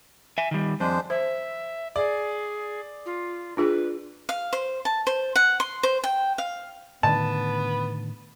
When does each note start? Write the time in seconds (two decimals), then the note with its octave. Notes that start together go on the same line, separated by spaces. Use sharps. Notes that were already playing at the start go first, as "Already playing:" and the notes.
0.38 E5 G#5
0.51 D#3 G3
0.80 F2 G#3 D4 C5
1.10 C5 E5
1.96 G#4 D5
3.06 F4
3.57 D4 F4 G#4 B4
4.29 F5
4.53 C5
4.85 A5
5.07 C5
5.36 F#5
5.60 C6
5.83 C5
6.04 G5
6.38 F5
7.03 A2 D3 D#3 B3 A5